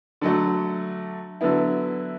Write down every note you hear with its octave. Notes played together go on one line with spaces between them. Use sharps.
D3 F#3 A3
D3 F#3 B3 E4